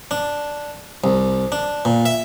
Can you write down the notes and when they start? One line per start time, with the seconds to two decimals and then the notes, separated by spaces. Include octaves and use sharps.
0.11 D4
1.04 C2
1.52 D4
1.85 A#2
2.06 E5